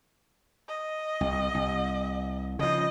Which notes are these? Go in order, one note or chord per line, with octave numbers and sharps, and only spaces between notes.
D#5
C2
C2
C#3 F3 D#5